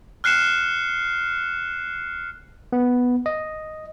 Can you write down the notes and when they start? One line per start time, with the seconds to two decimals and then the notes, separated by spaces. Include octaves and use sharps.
0.24 F6 F#6 C7 C#7 E7
2.73 B3
3.26 D#5